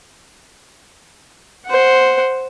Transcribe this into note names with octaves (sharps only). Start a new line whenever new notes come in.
C5 F#5